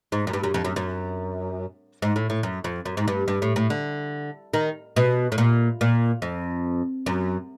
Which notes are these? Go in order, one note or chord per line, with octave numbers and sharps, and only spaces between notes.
G#2
F#2
G2
F#2
F2
F#2
F#2
G#2
A2
A2
F#2
F2
F#2
G#2
G2
G2
A2
A2
D3
D#3
B2
A2
A#2
A#2
F2
F#2